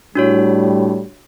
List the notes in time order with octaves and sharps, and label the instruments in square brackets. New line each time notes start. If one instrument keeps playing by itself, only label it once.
[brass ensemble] A2 G3 [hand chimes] D4 F#4 C#5